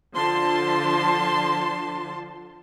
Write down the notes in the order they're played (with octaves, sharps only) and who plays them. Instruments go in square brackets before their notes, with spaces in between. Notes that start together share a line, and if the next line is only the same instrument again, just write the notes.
[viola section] D3 F3 A5 C6